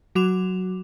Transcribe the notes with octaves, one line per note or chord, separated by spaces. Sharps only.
F#3 F#4 D6 E7 F7